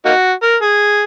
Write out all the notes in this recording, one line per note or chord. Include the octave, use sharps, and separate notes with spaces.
A#3 D#4 F#4
A#4
G#4